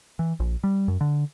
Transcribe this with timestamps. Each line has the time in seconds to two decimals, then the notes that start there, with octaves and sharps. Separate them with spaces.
0.19 E3
0.40 A#1
0.64 G3
0.88 F#2
1.01 D3